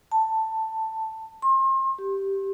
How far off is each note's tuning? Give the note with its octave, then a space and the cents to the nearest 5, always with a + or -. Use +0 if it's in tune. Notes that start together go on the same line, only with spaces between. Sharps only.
A5 +10
C6 +35
G4 -5